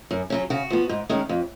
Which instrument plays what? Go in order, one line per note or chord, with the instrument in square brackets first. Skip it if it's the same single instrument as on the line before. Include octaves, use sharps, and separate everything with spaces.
[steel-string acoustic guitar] F#2
C#3 F#3 C#4
C#3 F#4
F3 B3
G#2
D#3 G#3 C#4
F2